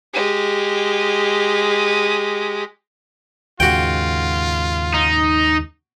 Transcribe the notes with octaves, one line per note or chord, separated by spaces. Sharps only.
G#3 G4
D#2 G#2 C#3 F4 F#4 G5
D#4